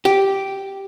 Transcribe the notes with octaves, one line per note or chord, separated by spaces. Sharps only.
G4